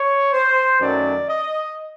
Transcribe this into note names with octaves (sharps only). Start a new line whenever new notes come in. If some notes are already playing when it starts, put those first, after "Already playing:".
Already playing: C#5
C5
F#2 D#3 F#3 A3 D5
D#5